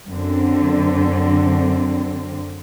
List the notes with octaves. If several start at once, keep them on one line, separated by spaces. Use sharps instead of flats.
F#2 D3 C4